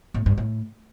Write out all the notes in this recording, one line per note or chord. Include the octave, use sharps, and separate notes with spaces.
A2
G2
A2